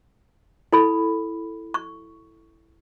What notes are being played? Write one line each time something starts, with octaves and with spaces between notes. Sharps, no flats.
E4 A4 B5
C#6